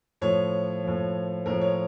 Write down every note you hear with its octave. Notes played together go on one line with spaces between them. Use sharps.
A2 F3 C#5
A2 F3
A2 F3 A#4
C#5